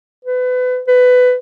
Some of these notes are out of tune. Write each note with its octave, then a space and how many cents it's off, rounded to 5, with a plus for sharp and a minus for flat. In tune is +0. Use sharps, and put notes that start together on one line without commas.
B4 +30
B4 +15